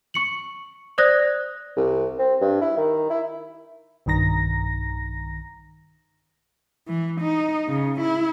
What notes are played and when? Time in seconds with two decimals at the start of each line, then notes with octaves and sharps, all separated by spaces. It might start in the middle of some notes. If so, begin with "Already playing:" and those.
0.14 C#6 C#7 F#7
0.98 C5 D5 D#6 F#6 G#6 A#6
1.77 C2
2.19 C4
2.41 G2
2.61 E4
2.77 D#3
3.10 E4
4.06 B1 G2 D#3 A#5 A#6
6.88 E3
7.21 D#4
7.68 C#3
8.01 E4